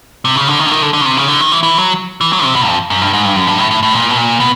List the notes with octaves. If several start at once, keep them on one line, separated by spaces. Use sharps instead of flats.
C3
C#3
D3
D#3
D3
D#3
D3
D3
C#3
C3
C#3
D3
D#3
E3
E3
F#3
E3
F#3
C3
B2
F2
F#2
G2
G#2
G2
F#2
G2
A2
A2
A2
A#2
B2
A#2
B2